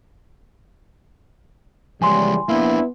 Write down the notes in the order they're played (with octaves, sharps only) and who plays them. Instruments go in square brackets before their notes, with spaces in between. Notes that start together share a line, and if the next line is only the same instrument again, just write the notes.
[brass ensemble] C#3 E3 G3 [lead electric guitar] F3 G#3 [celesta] G#5 C6
[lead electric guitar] A#3 D4 [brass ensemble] B3 [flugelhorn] E4